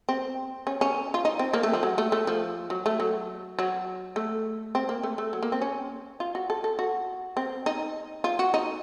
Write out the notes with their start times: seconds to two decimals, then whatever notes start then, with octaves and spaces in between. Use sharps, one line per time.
0.09 C4
0.67 C#4
0.81 C#4
1.14 F4
1.25 D#4
1.39 C4
1.53 A#3
1.63 A3
1.73 F3
1.83 F#3
1.98 A3
2.12 A3
2.27 F3
2.70 F#3
2.86 A3
3.00 F#3
3.59 F#3
4.16 A3
4.75 C4
4.89 A#3
5.03 A3
5.18 A3
5.33 F#3
5.42 A#3
5.52 C4
5.62 C#4
6.20 F4
6.35 F#4
6.50 A4
6.64 A4
6.79 F#4
7.37 C4
7.66 D#4
8.24 F4
8.39 F#4
8.54 D#4